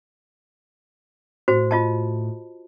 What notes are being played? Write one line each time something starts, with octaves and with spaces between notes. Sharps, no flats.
A2 F#4 C5
F4 D#5 A5